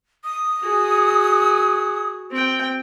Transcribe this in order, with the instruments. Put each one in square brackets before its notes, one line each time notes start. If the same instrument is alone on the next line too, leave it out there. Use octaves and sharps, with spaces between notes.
[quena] D#6
[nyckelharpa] F#4 G#4
C4 G5